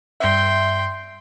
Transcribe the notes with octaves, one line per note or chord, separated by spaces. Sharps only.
G2 E5 G5 C6